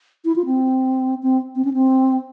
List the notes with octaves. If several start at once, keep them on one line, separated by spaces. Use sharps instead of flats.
E4
F4
C4
C4
C4
C#4
C4